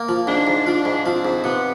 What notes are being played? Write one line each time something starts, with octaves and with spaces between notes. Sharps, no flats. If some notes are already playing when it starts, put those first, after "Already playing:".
Already playing: A#3
F3
G#2 D4
G#2
F3 D4
G#2
F3 C4
G#2
C3 B3